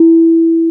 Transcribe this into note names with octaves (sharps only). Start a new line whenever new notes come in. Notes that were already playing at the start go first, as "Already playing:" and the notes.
Already playing: E4